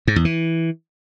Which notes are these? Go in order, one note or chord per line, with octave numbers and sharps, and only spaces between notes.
G#2
E2
E3